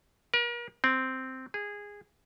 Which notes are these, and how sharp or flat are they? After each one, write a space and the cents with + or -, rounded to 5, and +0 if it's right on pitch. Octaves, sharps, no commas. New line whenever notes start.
A#4 +40
C4 -5
G#4 -15